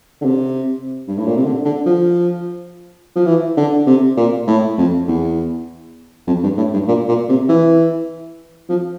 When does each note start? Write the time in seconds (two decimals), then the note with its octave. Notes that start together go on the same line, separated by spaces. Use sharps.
0.21 D3
0.25 C3
1.08 G2
1.18 A2
1.26 A#2
1.36 C3
1.45 D3
1.65 D3
1.86 F3
3.16 F3
3.26 E3
3.57 D3
3.87 C3
4.17 A#2
4.47 A2
4.78 F2
5.08 E2
6.27 F2
6.43 G2
6.57 A2
6.73 G2
6.88 A#2
7.08 A#2
7.29 C3
7.49 E3
8.69 F3